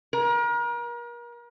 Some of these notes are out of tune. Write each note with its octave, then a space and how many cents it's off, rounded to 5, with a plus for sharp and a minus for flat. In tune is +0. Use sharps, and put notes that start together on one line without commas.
A#4 +35